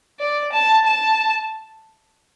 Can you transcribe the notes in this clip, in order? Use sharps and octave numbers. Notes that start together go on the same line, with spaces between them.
D5
A5
A5